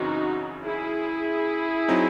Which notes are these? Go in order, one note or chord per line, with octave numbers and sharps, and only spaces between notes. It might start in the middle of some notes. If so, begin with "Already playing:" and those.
Already playing: F#2 C#3 E3 C4 D#4 F#4
E4 G#4
F#3 C4 D#4